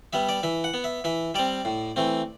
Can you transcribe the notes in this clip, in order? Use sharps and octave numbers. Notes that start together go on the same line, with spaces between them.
G3 B3 E5
D5
E3 E5
F#5
B3
E5
E3 E5
G3 C4 D5
A2
E3 A3 C4